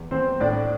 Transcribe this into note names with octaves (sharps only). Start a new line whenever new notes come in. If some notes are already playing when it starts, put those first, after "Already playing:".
Already playing: E2
E2 C4 C5
A2 D4 D5